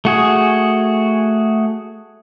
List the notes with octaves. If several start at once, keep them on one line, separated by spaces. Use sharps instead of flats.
A3 F#4 G#4